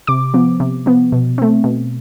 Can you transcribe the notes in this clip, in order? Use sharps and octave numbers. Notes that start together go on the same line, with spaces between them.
C3 D6
F3 B3
C3
F3 B3
B2
A3 C4
B2